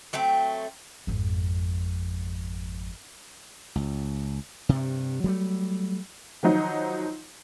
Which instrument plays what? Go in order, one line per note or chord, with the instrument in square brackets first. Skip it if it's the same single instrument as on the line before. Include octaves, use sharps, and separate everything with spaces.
[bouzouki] F#3 A3 C4 G5
[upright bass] G#1 F2
[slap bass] C#2
G2 C3
F#3 G3 A3
[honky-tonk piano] D#3 F3 F#3 D#4